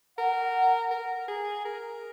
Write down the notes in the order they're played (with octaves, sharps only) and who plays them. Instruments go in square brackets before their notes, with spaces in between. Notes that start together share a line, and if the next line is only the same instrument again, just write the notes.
[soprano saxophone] A#4 [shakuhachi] F#5
[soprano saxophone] A#4
G#4
A#4